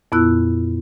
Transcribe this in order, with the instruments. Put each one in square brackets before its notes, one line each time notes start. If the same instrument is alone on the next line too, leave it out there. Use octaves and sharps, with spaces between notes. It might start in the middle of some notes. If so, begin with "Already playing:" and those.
[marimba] F2 A#2 B3 E4 E6 F#6